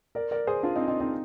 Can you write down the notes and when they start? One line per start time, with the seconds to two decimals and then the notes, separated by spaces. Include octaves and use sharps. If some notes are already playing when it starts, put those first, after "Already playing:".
0.15 A#4 D5
0.31 A#4 D5
0.47 G#4 C5
0.63 D4 F4
0.76 C4 D#4
0.88 C4 D#4
1.00 C4 D#4